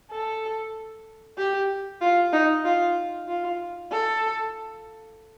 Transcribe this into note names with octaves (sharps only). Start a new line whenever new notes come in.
A4
G4
F4
D#4
F4
F4
A4